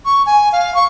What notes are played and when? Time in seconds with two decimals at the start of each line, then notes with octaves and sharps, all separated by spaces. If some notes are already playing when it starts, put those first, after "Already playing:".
0.05 C#6
0.26 G#5
0.52 F5
0.74 C#6